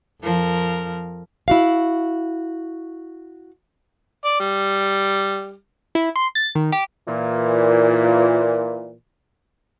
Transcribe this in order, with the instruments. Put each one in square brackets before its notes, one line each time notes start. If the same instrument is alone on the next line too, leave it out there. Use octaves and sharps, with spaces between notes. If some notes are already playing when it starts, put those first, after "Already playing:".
[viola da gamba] F2 F3 A#4
[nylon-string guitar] E4 F#4 F5
[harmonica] D5
G3
[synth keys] E4
C6
A6
D#3
G4
[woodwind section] A#2 E3